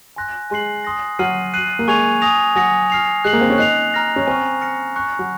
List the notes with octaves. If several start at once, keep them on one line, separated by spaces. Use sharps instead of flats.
G#5 C6 F#6 A#6
G#3 G#5 C6 F#6 C7 F#7
C6 D#6 A#6
F#3 F6 C7 D#7 F#7
F#6 C7 D#7 F#7
A#3
G#3 G#5 C#6 G#6 C#7 F7
G#5 D#6 A#6 F7
F#3 G#5 D#6 A#6 C#7
F6 C7 F7
G#3 F#6 C7 F#7
A#3
C4
C#4
D#4 F#6 C7 F7
A#5 F6 A#6 F7
C#4
C4 G#5 C#6 F6
F6 A#6 C#7
C#6 F#6 C#7
F#3